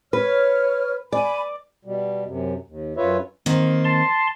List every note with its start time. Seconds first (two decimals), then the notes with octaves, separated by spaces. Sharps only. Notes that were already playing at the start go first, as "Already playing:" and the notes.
0.13 B4 C#5 F6
1.12 D5 G#5 B5
1.85 B2 G3
2.26 F#2 C3
2.68 D#2
2.97 F#2 F4 B4 C#5 E5
3.46 D#3 A#3 C4
3.85 A5 C6